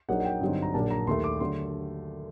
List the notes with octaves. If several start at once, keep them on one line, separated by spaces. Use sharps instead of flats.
A#1 A#2 F#3 A#3 D#4 F#5
F#5
G5
G2 D3 F#3 C4 D#4
A#5
A#1 A#2 F#3 A#3 D4 A5
A#5
D#2 D#3 A3 C6
D6
D3 F#3 A3 C6